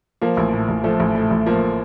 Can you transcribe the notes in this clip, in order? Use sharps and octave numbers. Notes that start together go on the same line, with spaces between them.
F3 A#3
A1
A2
A1
F3 A3
A1
A2 A3
A1
F3 A#3